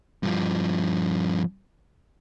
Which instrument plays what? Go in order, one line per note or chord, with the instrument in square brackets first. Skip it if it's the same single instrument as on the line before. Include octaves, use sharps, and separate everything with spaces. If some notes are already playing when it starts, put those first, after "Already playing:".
[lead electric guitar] G2 F3